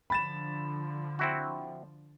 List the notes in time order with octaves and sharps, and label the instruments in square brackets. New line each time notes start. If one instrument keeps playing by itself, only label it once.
[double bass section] D3 F3 [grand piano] B5 A6 E7
[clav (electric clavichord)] C4 E4 F#4